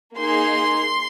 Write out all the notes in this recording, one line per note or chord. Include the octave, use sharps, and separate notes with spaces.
A#3 D#4 G#4 C6